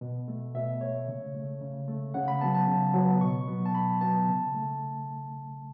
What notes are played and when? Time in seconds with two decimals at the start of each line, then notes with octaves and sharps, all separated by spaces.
0.01 B2
0.28 A3
0.55 B2 E5
0.81 A3 C#5
1.08 C#3
1.35 A3
1.61 C#3
1.88 A3
2.14 C#3 F#5
2.28 B5
2.41 F#3 B3 A5
2.54 A5
2.67 C#3
2.94 F#3 B3
3.21 B2 C#6
3.48 F#3 B3
3.66 A5
3.74 B2 B5
4.01 F#3 B3 A5
4.28 C#3
4.55 A3